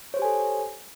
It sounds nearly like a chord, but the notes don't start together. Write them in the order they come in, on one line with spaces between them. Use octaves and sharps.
C#5 C5 G4 G#5 A4